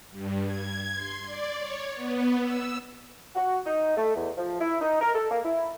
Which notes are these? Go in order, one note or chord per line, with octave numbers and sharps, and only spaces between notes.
G2
G#6
C6
D5
C#5
B3
E6
F#4
D#4
A3
E2
F3
E4
D#4
A#4
A4
A#3
E4